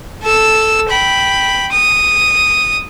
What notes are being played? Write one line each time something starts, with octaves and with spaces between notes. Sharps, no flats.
A4 E6
G5 B5
D#6